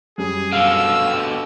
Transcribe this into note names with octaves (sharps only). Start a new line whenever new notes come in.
F#2 G3 G#4
B2 D3 F5 E6
G5